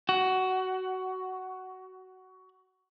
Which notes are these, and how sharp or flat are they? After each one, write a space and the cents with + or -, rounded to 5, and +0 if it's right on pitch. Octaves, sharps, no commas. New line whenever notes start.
F#4 +15